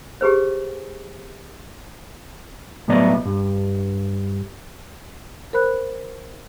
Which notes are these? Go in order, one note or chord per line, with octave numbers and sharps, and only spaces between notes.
G4 G#4 B4 C5
C2 A2 F#3 B3 D5 D#5
G2
A#4 C5 B5 F#6